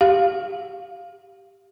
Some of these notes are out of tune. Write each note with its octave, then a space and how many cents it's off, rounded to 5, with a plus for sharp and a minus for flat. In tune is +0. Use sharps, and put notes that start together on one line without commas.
G4 +0 F5 +0